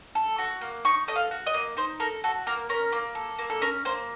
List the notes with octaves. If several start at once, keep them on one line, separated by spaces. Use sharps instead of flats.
A4
F#4
A#3
D#4 C#6
A4 D#5
F5
F#4
D#5
A#3
D#4 C5
A4 A#4
F#4 A4
A#3 A#4
C#4 A#4
A#3
A4
A#3
A4
C#4 A#4
A#3 C5